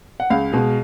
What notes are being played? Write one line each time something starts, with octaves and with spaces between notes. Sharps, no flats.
F#5
C#2 F5
B2 G#3